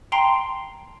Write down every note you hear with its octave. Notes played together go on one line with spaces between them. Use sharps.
G5 A5 A#5 C6 C7 D7